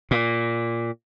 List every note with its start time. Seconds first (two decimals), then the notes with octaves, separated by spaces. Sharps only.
0.11 A#2